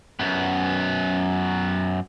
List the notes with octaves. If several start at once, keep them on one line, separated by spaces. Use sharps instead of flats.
F#2 B3